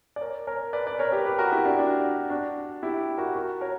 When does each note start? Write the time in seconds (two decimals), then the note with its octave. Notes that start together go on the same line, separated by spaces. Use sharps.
0.16 D5
0.21 A#4 C#5
0.47 A#4 C#5
0.73 B4 D5
0.86 B4 D5
0.99 A#4 C#5
1.12 G4 B4
1.26 G4 B4
1.39 F#4 A#4
1.52 E4 G4
1.65 D4 F#4
1.78 D4 F#4
2.30 D4 F#4
2.83 E4 G4
3.18 F#4 A#4
3.35 F#4 A#4
3.61 A#4 C#5